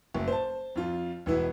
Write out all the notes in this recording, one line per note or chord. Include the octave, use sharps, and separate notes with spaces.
F#1
C5 A5
F2 F4
E1 B3 E4